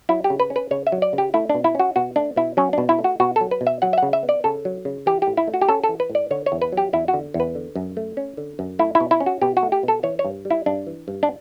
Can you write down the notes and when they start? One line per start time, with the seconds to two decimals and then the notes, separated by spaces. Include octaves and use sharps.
0.09 F#3 E4
0.24 G4
0.30 C#3
0.40 B4
0.50 C#4
0.56 B4
0.71 C#3 C#5
0.87 E5
0.92 F#3
1.02 D5
1.13 C#3
1.18 G4
1.34 A3 E4
1.49 D4
1.55 B2
1.64 E4
1.75 C#4 F#4
1.96 B2 F#4
2.16 A3 D4
2.36 B2 E4
2.57 F#3 C#4
2.73 B2 D4
2.89 E4
2.99 A3
3.04 F#4
3.20 B2 F#4
3.36 F#3 A4
3.51 B4
3.61 B2
3.67 E5
3.82 F#3 F#5
3.93 E5
3.98 F#5
4.03 C#3
4.13 E5
4.23 B3
4.29 D5
4.44 C#3 A4
4.65 F#3
4.85 C#3
5.06 E3 G4
5.22 G4
5.27 A2
5.37 E4
5.47 A3
5.54 F#4
5.61 G4
5.69 C#4 A4
5.84 A4
5.89 E3
6.00 B4
6.10 A2
6.15 D5
6.31 D3 C#5
6.46 C#5
6.52 E2
6.62 B4
6.72 F#3 G4
6.93 E2 E4
7.08 F#4
7.13 D3
7.34 E2
7.40 B4
7.55 D3
7.76 F#2
7.97 A3
8.17 C#4
8.37 D3
8.59 F#2
8.79 A3 E4
8.95 E4
9.00 B2
9.11 E4
9.21 C#4
9.26 F#4
9.42 B2 G4
9.57 F#4
9.63 A3
9.72 G4
9.83 B2
9.88 A4
10.03 E3 C#5
10.19 C#5
10.25 G2
10.45 G3
10.50 E4
10.66 G2 D4
10.87 E3
11.08 G2
11.23 D4